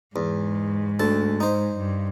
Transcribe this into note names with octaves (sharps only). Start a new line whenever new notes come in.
E2 G#2
D2 A4 A5
D#4 C5
G2